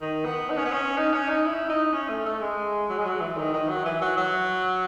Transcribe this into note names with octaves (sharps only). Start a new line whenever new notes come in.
D#3
B3
D#4
C#4
B3
C#4
D#4
C#4
D#4
E4
D#4
C#4
A3
A3
G#3
F#3
G#3
F#3
E3
D#3
D#3
F#3
E3
F#3
F#3